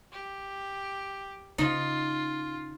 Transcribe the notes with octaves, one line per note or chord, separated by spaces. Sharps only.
G4
C#3 D#4 F4